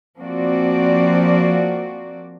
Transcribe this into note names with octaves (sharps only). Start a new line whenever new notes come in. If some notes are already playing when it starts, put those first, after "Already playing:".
F3 A#3 C4 F#4 D5